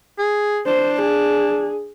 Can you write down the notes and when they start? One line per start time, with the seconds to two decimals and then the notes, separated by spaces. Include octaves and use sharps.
0.19 G#4
0.67 D4 C5
1.02 G#4